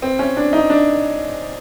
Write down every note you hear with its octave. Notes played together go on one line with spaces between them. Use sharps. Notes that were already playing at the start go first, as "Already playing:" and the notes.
C4
C#4
D4
D#4
D4